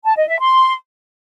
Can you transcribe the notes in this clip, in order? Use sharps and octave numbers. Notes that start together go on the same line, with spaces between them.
A5
D#5
E5
C6